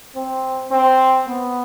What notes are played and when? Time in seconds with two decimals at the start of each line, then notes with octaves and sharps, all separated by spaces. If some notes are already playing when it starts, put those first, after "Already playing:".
0.15 C4
0.71 C4
1.27 B3